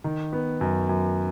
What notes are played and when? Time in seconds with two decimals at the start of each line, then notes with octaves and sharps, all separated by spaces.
0.04 D#3
0.33 B3
0.61 F#2
0.89 F#2